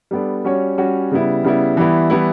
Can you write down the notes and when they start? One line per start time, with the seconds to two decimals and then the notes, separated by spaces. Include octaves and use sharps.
0.11 G3 B3 D4 A4 D5
0.45 G3 C#4 F#4 C#5
0.78 G3 C#4 F#4 C#5
1.11 C#3 G3 B3 E4
1.44 C#3 G3 B3 E4
1.77 E3 G3 B3 E4
2.10 E3 G3 B3 E4